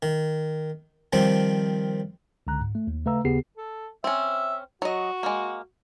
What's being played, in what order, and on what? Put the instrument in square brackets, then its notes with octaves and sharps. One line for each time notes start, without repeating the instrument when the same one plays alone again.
[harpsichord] D#3
D#3 F3 G3 C4
[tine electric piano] C#2 D3 A#5 F#6
G#2
A3
D#2
C#3 A3 B4 F5 A#5 E6
D#2 C#3 B3 G4 G#4 C7
[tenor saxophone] A4
[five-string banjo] C4 C#4 [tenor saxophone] E5
[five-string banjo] F#3 D#5 [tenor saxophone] F#4
[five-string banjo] G#3 A#3